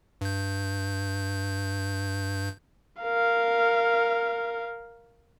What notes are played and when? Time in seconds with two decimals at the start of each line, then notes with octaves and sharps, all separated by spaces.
0.21 G2 G6
3.02 A#4 F5